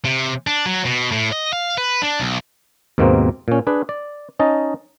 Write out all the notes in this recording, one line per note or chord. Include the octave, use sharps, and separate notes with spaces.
C3
D4
F#3
B2
A2
D#5
F5
B4
D4
B1
D#2 G#2 B2 A#3 C4
A#2 C#4
D4 G#4 B4
D5
C#4 D#4 D#5 A5